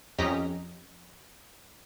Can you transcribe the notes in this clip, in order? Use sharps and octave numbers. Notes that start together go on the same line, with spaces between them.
F2 C#4 G4 D#5 A#5 B6